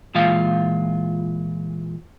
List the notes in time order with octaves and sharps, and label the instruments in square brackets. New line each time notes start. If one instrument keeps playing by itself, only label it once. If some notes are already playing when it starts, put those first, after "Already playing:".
[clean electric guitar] A#2 E3 G#3 F4 F5